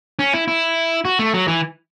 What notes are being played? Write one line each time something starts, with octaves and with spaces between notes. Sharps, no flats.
C#4
E4
E4
F#4
A3
F#3
E3